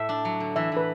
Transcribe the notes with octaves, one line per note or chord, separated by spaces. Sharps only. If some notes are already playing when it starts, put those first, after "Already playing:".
Already playing: A2 A3 E5
D4
F#3
D3
E3 E5
E3 B4